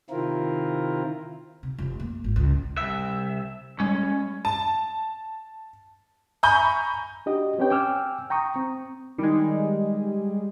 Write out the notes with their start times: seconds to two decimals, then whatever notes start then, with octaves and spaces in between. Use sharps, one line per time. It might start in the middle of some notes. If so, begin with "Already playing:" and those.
0.10 C3 D#3 C4 E4 F4 A#4
1.63 C3
1.78 F1 E3
2.00 A#3
2.24 G#1
2.36 C#2
2.77 C2 E5
3.80 G3 G#3 C#4
4.45 A5
6.43 G#5 A#5 B5 C#6 G6
7.26 D4 F#4 G4 D#5
7.58 C4 C#4 G4 B4 C#5 G5
7.70 G5 G#5 D6 E6 F6
8.30 G5 A#5 C#6 D#6
8.56 C4
9.18 D#3 G3 G#3